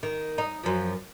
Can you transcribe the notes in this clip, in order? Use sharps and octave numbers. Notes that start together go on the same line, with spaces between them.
D#3
D#4
F#2 F3